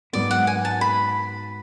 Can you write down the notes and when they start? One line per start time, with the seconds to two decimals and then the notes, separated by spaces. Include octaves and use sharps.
0.13 G#2 F#3 B3 D5
0.31 F#5
0.47 G#5
0.65 A5
0.81 B5